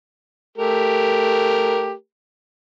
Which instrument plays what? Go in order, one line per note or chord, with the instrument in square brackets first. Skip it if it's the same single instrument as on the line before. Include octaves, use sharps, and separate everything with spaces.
[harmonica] A3 G4 A#4